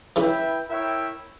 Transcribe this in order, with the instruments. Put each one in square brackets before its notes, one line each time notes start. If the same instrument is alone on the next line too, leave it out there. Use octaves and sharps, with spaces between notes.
[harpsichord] C#3 E3 [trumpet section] E4 B4 E5 G5
[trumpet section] E4 A#4 C#5 E5 G5